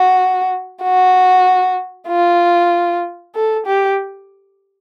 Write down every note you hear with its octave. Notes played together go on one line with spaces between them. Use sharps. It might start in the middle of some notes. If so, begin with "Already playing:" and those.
Already playing: F#4
F#4
F4
A4
G4